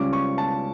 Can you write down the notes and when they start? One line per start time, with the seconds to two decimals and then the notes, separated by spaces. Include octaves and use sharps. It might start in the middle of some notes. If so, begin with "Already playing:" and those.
Already playing: C#2 C#3 G3 C#4 D6
0.13 C#6
0.38 A5